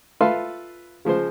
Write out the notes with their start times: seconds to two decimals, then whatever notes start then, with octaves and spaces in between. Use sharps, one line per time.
0.21 F4 A4 B4 E5 F5 C6
1.05 C#3 F3 G#3 C5